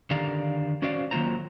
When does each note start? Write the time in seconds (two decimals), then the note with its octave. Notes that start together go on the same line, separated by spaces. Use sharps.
0.11 D3 D#3 G4 D5 F5 A#5
0.82 C#4 F#4 C5 D5 F5
1.11 D#3 F#3 A#3 F4 C5 A#5